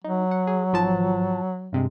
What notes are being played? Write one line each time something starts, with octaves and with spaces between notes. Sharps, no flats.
F#3 D#4
F#5
G#4
G#1 F3 A5
G2 C3 G#3